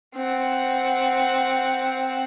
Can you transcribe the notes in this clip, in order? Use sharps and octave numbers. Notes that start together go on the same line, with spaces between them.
C4 F#5